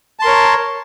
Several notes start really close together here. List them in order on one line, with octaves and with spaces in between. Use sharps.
A5 C6 A#4 C#5